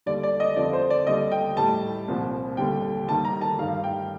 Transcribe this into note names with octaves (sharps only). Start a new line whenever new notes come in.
D#2 D3 G3 D5
D5
D#5
F2 D3 F3 D5
C5
D5
D#2 D3 G3 D#5
G5
A2 G3 A5
C2 A#2 F3
D#2 D3 G3 G5
D#2 D#3 G3 A5
A#5
A5
G2 D#3 G3 F5
G5